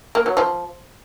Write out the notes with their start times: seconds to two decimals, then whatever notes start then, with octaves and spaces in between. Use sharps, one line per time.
0.15 A#3
0.26 F#3
0.37 F3